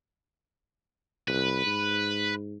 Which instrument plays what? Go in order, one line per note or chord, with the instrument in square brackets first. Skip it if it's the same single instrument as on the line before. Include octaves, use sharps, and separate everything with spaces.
[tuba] C2 [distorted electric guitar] B4
[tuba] G#2